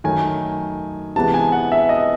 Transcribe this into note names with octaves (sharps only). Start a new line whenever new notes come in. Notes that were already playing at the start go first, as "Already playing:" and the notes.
F#2 D#3 F#3 A3 G#5
C3 E3 G#3 B3 A5
G#5
F#5
E5
D#5